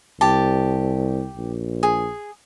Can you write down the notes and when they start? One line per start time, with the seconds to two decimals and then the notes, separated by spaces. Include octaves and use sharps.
0.21 C2 G4 A5
1.37 A#1
1.83 G#4